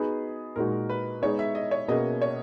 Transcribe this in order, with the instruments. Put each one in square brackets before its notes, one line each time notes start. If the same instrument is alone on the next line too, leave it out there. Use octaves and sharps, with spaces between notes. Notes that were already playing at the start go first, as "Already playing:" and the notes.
Already playing: [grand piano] B3 D#4 G#4 B4 [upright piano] F#4
[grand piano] A#2 G#3 D#4 F#4 [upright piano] A#4
[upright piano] B4
[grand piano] G#3 B3 D#4 G#4 [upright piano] C#5
[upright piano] E5
D#5
C#5
[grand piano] B2 A#3 C#4 G#4 [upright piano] D#5
[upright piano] C#5